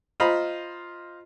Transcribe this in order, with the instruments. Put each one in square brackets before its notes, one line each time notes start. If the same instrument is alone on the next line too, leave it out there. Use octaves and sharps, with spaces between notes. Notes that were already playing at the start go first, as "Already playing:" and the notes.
[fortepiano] F4 C5 D#5 A#5 B5